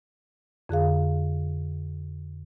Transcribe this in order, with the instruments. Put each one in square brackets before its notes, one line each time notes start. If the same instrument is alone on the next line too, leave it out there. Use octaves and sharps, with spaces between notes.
[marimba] F2 D3 G#4 F5